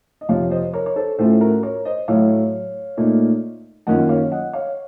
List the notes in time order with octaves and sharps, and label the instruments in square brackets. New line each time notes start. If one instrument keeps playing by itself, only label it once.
[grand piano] D#5
F2 C3 F3 C#5 F5
C5 D#5
A#4 C#5
C#5
A4 C5
A2 A3 C#4 F4 A4 C5
F#4 A#4
A#4 C#5
C5 D#5
A2 F#3 A3 C#5 F5
A#2 A3 D#4
F#2 D#3 A#3 C#4 F4 D#5 F#5
C#5 F5
D#5 F#5
C#5 F5